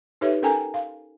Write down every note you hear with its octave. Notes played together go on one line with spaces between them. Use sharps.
D#4 G4 A4 B4 C#5 E5
C#4 A4 A#4 G5 G#5 A#5
F5